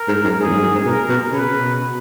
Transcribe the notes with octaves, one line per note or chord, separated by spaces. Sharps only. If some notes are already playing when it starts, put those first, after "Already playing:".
Already playing: A#4
G#2
F#2
G#2 G#4
E2
F#2
G#2
F#2
G#2
B2 A#4
B2
C#3 B4
B2